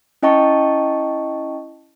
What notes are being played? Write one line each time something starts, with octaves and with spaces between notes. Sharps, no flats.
C#4 E4 D#5 G5 A5 C#6